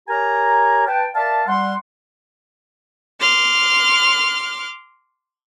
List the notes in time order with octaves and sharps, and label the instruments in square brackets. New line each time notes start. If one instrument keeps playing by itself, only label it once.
[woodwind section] G4 A#4 C#5 G#5 A#5
B4 G5 A5
A#4 D5 E5 F5 A5
G3 F#5 C6
[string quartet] C6 D6 F6